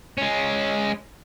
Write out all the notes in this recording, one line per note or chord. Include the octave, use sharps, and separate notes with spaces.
G#3 C#4